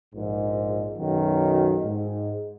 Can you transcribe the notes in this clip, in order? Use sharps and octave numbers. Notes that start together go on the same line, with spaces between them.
A#1 G#2
B1 F#2 D#3 F#3
G#2